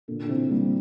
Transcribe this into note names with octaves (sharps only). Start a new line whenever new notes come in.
A#2 D3
D3
C3 E3
G3 A#3